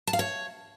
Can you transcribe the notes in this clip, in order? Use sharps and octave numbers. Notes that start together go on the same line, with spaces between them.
A5
F5
C#5